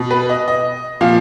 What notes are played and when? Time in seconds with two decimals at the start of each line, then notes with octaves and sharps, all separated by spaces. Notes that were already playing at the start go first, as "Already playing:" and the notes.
Already playing: B2
0.11 B4
0.29 D#5
0.48 D#5
1.01 A#2 F3 F5